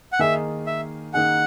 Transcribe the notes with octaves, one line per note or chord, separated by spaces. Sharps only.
F#5
D#3 A#3 D#4 G#4 E5
E5
D#3 A#3 D#4 G#4 F#5